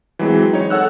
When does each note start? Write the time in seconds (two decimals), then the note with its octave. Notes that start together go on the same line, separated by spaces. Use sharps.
0.19 E3 F#3 G#3 C4
0.53 D#4 C#5
0.70 A4 C#5 F#5 E6 F#6